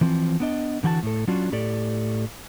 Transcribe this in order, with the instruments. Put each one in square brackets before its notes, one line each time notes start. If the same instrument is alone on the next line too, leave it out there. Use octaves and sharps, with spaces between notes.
[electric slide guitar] E3 F3 C4
B3 D4 D#5
D3 E3 F#4 G5 A5
A2 A4
F#3 C#4 D4 F4 F#4
A2 G4 A4 D5